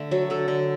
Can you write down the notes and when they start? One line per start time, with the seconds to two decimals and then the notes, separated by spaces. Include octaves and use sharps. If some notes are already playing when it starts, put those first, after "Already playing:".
Already playing: D3 A3
0.11 F#3 A4
0.30 D3 A4
0.48 D3